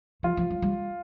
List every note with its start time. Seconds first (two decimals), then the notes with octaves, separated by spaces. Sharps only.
0.23 F3 F4
0.37 F3
0.50 F#3
0.62 G3